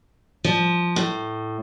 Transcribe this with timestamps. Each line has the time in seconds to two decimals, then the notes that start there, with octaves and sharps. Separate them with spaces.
0.44 F3
0.96 A2